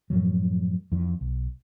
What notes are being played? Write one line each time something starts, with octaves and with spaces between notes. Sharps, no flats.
F#2 A2 F3 F#3
F2 E3
B1